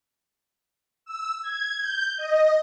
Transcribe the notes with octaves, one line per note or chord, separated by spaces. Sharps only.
E6
G#6
G6
D#5